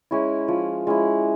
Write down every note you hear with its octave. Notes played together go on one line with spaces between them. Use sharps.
G#3 C#4 E4
F3
G#3 C#4 E4